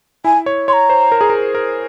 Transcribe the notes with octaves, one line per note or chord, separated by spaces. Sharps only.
E4 G#5
C#5
C#5 C6
A#5
C5
A#4
G#4
A#4
A#4